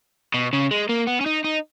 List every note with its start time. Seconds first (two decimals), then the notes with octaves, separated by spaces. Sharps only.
0.34 B2
0.53 C#3
0.71 G#3
0.89 A#3
1.07 B3
1.21 C#4
1.26 D#4
1.44 D#4